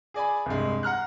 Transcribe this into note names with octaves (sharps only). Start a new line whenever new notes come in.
G#4 D5 G#5 B5
C2 G2 G#3
F#5 A#5 F6 F#6